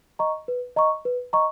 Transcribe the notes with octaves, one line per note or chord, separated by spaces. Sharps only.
D#5 A#5 C#6
B4
D#5 A#5 C#6
B4
D#5 A#5 C#6